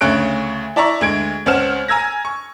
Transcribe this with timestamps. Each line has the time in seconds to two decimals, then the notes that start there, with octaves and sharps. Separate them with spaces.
0.01 D2 C#3 A3 C#5 F#6 D7
0.76 E4 D5 E5 A#5 C#6
1.01 D2 G#3 G#6 D7
1.46 C#2 C4 C#4 F#5 F6 E7
1.88 G#5 A#5 E6 G#6 A#6
2.25 C#6